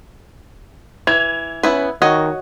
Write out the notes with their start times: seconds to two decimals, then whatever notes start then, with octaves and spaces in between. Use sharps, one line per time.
1.07 E3 G#6 F7
1.63 B3 C#4 E4 B4
2.02 D#3 F#4 C#5 D#5